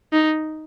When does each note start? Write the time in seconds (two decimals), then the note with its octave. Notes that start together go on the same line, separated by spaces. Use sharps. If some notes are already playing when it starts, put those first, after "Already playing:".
0.13 D#4